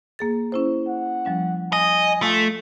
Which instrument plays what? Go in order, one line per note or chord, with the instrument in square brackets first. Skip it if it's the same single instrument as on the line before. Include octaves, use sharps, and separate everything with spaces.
[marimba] A#3 G#4 A6
C#4 E4 C5
[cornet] F#5
[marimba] F3 G3 C#4
[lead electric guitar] D#5 [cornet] G#5
[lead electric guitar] A3 [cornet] F4